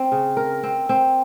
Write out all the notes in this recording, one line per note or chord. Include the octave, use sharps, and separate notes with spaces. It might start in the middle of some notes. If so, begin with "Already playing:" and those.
Already playing: C4
C#3
A#4
C4
C4